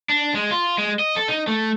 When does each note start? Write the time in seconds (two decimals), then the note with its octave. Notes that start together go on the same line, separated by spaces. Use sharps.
0.09 D4
0.34 G#3
0.51 F4
0.78 G#3
0.99 D#5
1.16 A4
1.28 D#4
1.47 A3